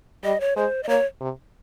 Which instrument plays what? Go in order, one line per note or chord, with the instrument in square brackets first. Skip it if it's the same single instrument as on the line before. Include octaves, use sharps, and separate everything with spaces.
[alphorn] G3 [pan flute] D#5
[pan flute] C#5
[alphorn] G#3 [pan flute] C5
[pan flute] D#5
[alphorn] A#3 [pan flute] C#5
[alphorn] C3